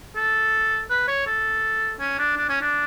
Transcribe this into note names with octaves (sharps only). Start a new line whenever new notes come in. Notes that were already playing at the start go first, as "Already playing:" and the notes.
A4
B4
C#5
A4
C#4
D4
D4
C#4
D4